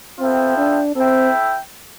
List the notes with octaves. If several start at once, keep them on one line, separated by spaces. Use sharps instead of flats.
B3 C4 F4 A4 E5 G5
D4
C4 E4 A4 E5 G5